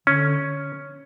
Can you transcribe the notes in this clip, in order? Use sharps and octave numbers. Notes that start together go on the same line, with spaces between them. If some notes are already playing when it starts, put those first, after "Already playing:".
D3 C#4